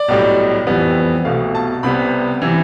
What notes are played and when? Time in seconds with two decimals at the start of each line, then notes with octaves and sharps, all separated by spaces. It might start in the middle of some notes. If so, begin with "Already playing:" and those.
Already playing: D5
0.08 B1 A2 G3
0.67 F2 E3 G3 B3
1.25 C2 B2 A3 F5
1.55 A5
1.83 C2 C3 G3 B3 B5
2.42 C3 E3